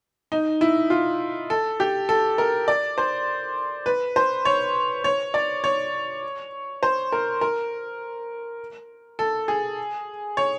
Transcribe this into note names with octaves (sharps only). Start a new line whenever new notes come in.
D#4
E4
F4
A4
G4
A4
A#4
D5
C5
B4
C5
C#5
C#5
D5
C#5
C5
A#4
A#4
A4
G#4
C#5